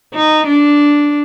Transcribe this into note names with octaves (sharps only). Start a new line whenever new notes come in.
D#4
D4